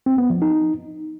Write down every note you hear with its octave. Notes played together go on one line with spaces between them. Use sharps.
C4
B3
F3
D#4